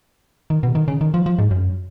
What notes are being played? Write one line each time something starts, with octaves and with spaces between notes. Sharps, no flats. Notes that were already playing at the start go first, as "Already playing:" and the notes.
D#3
B2
D#3
C#3
D#3
F3
F3
G#2
F#2